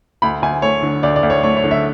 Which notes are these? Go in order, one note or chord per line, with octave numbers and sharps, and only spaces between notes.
D2 B5
D2 G#5
A3 C#5
D3
D2 D5
D5
D2
C#5
A3 C#5
C#5
D3
E5